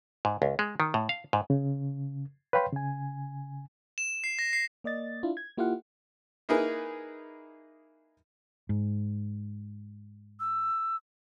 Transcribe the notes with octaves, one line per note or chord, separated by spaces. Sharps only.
G#2
C#2
G#3
D#3
A2
F5
G#2
C#3
B4 C#5 F5 G5 B5 C6
C#3 G#5
E7
C7
A#6
C7
A#3 D5 D#5 A6
D4 E4 F4
G#6
A#3 E4 F4 G4 F5 F#5
A#3 D#4 E4 G#4 A#4 B4
G#2
E6